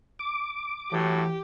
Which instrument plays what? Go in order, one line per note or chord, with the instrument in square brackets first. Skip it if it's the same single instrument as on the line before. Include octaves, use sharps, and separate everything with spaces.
[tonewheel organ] D6
[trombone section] A2 F#3 [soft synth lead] E3 [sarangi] G4